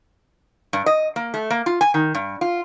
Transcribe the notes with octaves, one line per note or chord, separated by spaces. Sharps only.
G2
D#5
A#3
A3
A#3
F4
G#5
D#3
G2
F4